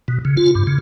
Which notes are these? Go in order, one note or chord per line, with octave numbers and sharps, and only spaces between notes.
B2
C#3
F4
G2
C#3